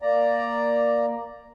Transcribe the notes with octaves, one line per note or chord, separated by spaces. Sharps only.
A#3 D5 A#5